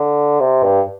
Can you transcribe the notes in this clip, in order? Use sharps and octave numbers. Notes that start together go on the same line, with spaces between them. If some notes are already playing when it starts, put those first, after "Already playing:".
Already playing: D3
C3
G2